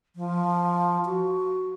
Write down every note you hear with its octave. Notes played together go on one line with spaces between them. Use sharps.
F3
F#4